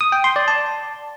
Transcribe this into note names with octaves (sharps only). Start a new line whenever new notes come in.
D#6
G5
C6
D5
A5